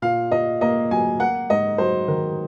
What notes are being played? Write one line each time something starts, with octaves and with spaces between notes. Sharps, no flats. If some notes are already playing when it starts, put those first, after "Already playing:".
A#2 F5
A#2 D#5
A#3 D#5
F#3 G#5
A#3 F#5
G#2 D#5
F#3 C5
D#3 A#4